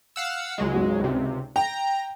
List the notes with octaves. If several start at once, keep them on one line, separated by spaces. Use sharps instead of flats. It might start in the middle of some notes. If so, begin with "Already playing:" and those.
F5 F#5 E6
C#2 F#3 G#3
G#1 F#4
C#2 C3
G5 A#5